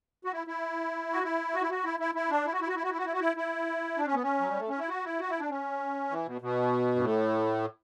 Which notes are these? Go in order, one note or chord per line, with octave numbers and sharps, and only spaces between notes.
F#4
E4
E4
F#4
E4
F#4
E4
F#4
E4
E4
E4
D4
E4
F#4
E4
F#4
E4
F#4
E4
F#4
E4
F#4
E4
E4
D4
C#4
B3
C#4
F#3
G3
A3
C#4
E4
F#4
E4
F#4
E4
D4
C#4
E3
B2
B2
G2
A2